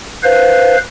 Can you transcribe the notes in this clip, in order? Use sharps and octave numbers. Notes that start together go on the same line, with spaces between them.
B4 C5 F5